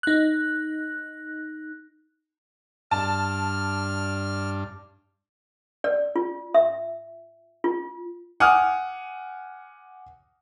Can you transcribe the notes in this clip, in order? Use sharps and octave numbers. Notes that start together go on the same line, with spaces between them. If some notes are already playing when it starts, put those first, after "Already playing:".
D#4 F#6
G2 D4 A5 F6
D5
F4
E5
F4
F#5 G#5 D6 D#6 F6